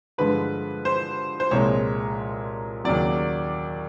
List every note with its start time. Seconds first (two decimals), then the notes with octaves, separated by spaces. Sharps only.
0.18 G2 D3 F3 G#3 B4
0.85 C5
1.40 C5
1.51 C2 A#2 F3 G#3 C#5
2.84 D#2 C#3 F#3 D5